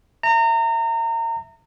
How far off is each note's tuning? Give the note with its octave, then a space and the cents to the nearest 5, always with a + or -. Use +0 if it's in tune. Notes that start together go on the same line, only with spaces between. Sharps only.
E5 +0 A#5 -30